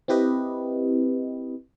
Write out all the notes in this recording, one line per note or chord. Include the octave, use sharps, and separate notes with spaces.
C4 E4 G4 B4 D#5